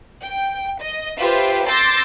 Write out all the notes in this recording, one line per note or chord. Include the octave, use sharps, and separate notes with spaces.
G5
D#5
F4 G4 B4 C5 E5
C6 D6 E6 G6 A6 A#6